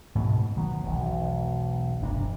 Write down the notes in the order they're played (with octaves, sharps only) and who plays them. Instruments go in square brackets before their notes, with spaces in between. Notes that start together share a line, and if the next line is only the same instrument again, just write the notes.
[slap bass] G#2 B2
D#3 F#3 B3
E1 B1
F1 G2 C3 D4